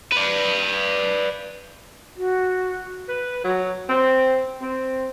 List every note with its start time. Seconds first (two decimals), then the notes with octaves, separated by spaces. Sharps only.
0.12 B4 D5
2.17 F#4
3.09 B4
3.45 F#3
3.89 C4
4.62 C4